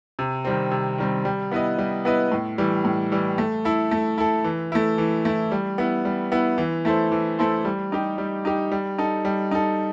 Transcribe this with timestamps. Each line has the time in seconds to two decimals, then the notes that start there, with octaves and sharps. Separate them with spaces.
0.19 C3
0.45 D#3 G3 C4
0.71 C3
0.98 D#3 G3 C4
1.25 G3
1.51 B3 E4 B4 D#5
1.78 G3
2.05 B3 E4 B4 D#5
2.32 A2
2.58 E3 G3
2.85 A2
3.12 E3 G3
3.38 A3
3.65 E4 A4
3.91 A3
4.18 E4 A4
4.44 E3
4.72 A3 E4
4.98 E3
5.25 A3 E4
5.52 G3
5.78 B3 E4
6.05 G3
6.32 B3 E4
6.58 E3
6.85 A3 E4 A4 C5
7.12 E3
7.38 A3 E4 A4 C5
7.65 G3
7.92 D#4 G4
8.18 G3
8.45 D#4 G4
8.72 G3
8.98 D#4 A4
9.25 G3
9.51 D#4 A4